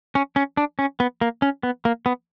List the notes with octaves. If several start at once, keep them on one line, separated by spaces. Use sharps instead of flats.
C#4
C#4
D4
C#4
B3
A#3
C#4
B3
A#3
B3